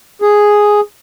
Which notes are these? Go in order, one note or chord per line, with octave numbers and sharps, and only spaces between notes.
G#4